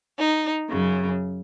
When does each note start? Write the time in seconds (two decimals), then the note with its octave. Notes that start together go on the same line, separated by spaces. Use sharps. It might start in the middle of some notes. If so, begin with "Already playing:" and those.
0.18 D#4
0.70 F#2 C#3